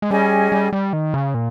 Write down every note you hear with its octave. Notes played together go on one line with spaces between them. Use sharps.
G#3
G3 C#4 G#4 D#5 G#5
G3
G3
D#3
C#3
A#2